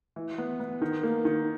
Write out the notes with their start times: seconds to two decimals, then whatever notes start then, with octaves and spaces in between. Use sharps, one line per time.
0.16 E3
0.38 B3
0.60 B3
0.82 D#3
1.03 A#3
1.25 D#3